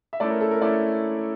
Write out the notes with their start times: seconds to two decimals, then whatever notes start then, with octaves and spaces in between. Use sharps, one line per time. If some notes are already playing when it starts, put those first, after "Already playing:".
0.13 E5
0.20 A3 C#4 E4 D5
0.30 A#4
0.41 A4
0.51 A#4
0.62 A3 C#4 E4 D5